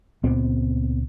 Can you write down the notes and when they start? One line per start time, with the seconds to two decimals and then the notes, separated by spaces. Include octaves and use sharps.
0.24 C#2 A#2 B3 C4